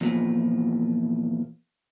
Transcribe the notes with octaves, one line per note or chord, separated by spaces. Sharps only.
E2 A#2 F3